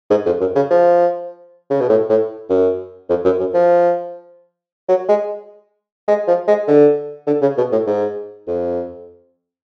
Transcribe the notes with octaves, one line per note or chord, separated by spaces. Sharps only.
G#2
F2
F#2
C#3
F3
C#3
B2
A2
A2
F#2
F2
F#2
F#2
F3
F#3
G#3
G#3
F3
G#3
D3
D3
C#3
B2
A2
G#2
F2